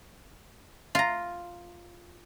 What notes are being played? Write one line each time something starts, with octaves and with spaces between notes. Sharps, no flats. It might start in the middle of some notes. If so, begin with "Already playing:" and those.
F4 A#5